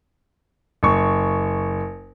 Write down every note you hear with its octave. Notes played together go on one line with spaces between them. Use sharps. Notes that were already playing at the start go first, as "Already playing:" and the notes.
F#1 C#6